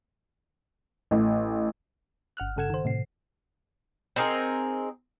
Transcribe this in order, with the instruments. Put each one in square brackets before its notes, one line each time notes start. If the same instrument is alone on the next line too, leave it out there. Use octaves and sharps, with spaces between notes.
[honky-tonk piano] A1
[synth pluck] G1 F#5 F6 F#6
G2 C#3 A4 F#5 G#6 E7
D#3 C5
A2 C3 C7
[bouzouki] C4 D#4 G#4 A#4